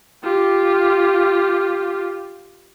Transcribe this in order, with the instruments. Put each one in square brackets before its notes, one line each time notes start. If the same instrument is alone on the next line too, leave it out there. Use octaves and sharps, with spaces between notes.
[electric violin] F4 G4